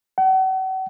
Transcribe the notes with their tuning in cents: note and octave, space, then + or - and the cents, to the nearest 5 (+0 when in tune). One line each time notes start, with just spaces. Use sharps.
F#5 +40